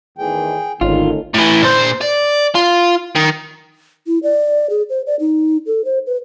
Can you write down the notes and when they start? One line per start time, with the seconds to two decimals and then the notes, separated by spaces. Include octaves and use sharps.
0.18 E2 A2 D#3 G#4 G5
0.81 G#1 D3 D#3 A3 C#4 D#4 F4
1.34 A2 E3
1.62 A#2 C5
2.01 D5
2.55 F4
3.16 D#3
4.07 E4
4.23 D5
4.70 G#4
4.89 C5
5.06 D5
5.20 D#4
5.66 A4
5.85 C5
6.06 B4